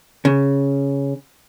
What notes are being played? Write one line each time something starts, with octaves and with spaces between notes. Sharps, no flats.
C#3